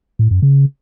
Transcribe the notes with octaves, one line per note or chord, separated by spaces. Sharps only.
A2
F#2
C#3